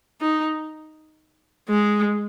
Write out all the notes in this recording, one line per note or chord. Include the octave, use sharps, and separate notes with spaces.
D#4
G#3